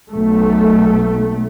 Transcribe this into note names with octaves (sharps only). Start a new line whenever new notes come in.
B1 A3